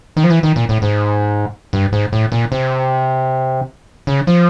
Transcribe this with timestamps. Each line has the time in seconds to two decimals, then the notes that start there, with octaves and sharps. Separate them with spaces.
0.17 D#3
0.24 F3
0.30 E3
0.43 D#3
0.56 A#2
0.69 A2
0.82 G#2
1.73 G2
1.92 G#2
2.12 A2
2.32 A#2
2.52 C3
4.07 C#3
4.27 F3